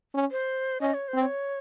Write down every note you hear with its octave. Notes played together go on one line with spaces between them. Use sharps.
C#4
C5
C#4 D#5
C#5
C5
C4
C#5